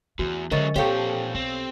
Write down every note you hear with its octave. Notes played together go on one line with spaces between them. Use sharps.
E2 E3 A3 F#4
D3 F#3 G#3 C#4 A#4 D#5 E5 A6
A#2 C4 G4 A4 C5 C#5 F5 C#6
B1 C4